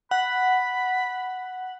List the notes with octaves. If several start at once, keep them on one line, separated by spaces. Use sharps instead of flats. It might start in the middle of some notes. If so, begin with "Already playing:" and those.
F#5 B5